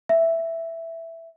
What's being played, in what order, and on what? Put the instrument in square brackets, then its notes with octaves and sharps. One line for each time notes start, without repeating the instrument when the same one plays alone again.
[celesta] E5